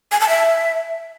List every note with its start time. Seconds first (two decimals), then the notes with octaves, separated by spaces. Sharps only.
0.12 G#5
0.20 A5
0.29 E5